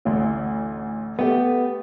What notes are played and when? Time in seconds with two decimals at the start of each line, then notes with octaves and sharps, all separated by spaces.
0.05 A1 D2
1.19 A3 B3 G4